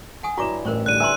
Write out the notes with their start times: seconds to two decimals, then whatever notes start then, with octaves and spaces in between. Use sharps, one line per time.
0.23 F#5 G#5 D#6
0.38 G2 E4 F#4 C#5 A#5 D6 E7
0.65 A1 A#4 C5 C#5
0.86 D3 G3 F#6 D#7
1.00 B4 E5 G#5 A#5 C6 E6